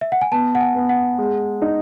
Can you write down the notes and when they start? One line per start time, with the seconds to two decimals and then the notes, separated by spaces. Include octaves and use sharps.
0.01 E5
0.12 F#5
0.21 G#5
0.32 B3 A5
0.55 F#5
0.61 G#5
0.75 B3
0.89 F#5
1.18 G#3
1.62 D#4